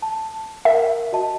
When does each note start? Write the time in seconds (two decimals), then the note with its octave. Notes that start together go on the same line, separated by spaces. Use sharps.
0.02 A5
0.65 A#4 E5
1.12 F#4 D#5 A5